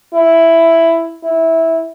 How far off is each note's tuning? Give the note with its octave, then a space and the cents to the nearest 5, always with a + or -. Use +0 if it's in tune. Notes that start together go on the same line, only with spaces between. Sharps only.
E4 +5
E4 -10